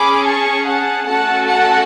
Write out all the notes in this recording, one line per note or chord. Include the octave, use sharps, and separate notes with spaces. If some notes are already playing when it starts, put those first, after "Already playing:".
Already playing: C#4 G#4 B5 D6
A5 C#6
F#5 A5
A3 C#4 F#4 A4 F#5 A5
F#5 A5